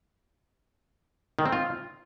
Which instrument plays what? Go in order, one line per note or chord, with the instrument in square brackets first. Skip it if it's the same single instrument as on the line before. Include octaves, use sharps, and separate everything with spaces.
[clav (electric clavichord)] D#3
C4
F4